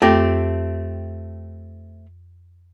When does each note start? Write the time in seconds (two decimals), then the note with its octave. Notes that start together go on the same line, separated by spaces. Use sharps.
0.02 F2 A3 C4 G4 A#6